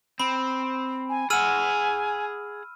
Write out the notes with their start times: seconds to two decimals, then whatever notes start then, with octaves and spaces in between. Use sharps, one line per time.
0.20 C4 B5
1.09 G#5
1.30 G#4 F#5 G#5 E6 F6 D#7